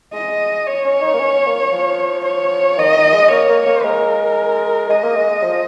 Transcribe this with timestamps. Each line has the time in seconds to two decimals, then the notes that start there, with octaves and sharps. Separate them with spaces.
0.13 G#3 D#5
0.67 C#5
0.84 C#4
1.02 D#4
1.14 A#3
1.19 C#4
1.33 C#4
1.46 A#3
1.72 F3
2.25 C#5
2.78 D#3 D#5
2.96 D#3
3.14 G#3
3.30 A#3 C#5
3.49 A#3
3.66 A#3
3.84 G#3 A#4
4.89 G#3 D#5
5.03 A#3
5.17 G#3
5.30 G#3
5.43 F3